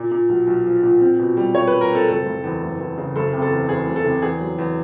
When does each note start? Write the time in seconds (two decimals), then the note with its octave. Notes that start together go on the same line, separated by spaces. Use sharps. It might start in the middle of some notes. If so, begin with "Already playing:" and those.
Already playing: A#2
0.11 A#2
0.29 B1
0.47 B1
0.66 F3
0.83 A#2
1.01 C4
1.19 B2
1.37 G3
1.55 G3 C#5
1.68 B4
1.72 G3
1.81 A#4
1.90 C4 A4
2.08 F#1 A4
2.26 F#1
2.44 E2
2.62 F#1
2.80 E2
2.98 C#3
3.16 F#1 A4
3.33 C3
3.42 A4
3.51 E2
3.69 E2 G#4
3.87 F#1
3.96 A4
4.05 C3
4.22 E2 G#4
4.41 F#3
4.59 E2